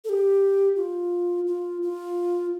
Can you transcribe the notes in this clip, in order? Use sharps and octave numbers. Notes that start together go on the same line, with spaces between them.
A4
G4
F4
F4
F4